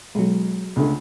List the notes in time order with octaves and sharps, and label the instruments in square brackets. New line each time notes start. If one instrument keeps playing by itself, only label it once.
[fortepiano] B1 [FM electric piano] F#3 G#3
[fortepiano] C#2 D3 A3